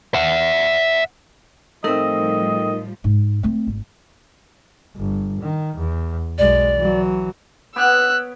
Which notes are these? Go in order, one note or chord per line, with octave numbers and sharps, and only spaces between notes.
E5 F#5
A2 F3 G3 A3 C4 D#4 A#4 D#5
G#2
A3 C4
G#1
G1
D#3
E2
B1 G#3 D5
E3 F#3
B3 G4 C#5 E6 F#6